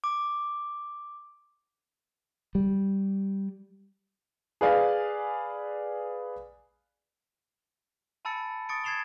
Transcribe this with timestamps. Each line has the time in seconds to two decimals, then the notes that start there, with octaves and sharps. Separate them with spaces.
0.04 D6
2.55 G3
4.61 G#4 B4 D5 F5 G#5
8.25 G#5 A5 B5 E6 A6 C#7
8.69 C#6 D#6 A6 C#7 D7
8.84 G#6 A6 C7 E7 F7 G7